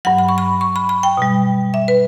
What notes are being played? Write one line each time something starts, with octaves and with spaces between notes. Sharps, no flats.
G2 F#3 F#5
B5
C#6
B5
C#6
B5
B5
G5
B2 G3
E5
B4